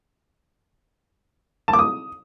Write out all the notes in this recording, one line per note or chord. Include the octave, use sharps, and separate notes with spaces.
A5
D6
D#6